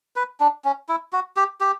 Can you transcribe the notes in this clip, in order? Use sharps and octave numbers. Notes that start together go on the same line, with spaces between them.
B4
D4
C#4
E4
F#4
G4
G4